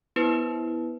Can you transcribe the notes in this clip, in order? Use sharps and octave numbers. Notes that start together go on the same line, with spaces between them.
B3 E4 B4 C5